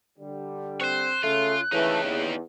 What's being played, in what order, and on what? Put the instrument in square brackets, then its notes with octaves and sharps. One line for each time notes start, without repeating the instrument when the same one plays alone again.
[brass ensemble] D3 G3
[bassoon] C4 [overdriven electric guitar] C5 C#5 [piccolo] F#6
[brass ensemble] C#3 [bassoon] A3 [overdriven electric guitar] F4
[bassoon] C#3 [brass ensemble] E3 A3 [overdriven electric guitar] D#4 G4
[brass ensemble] E2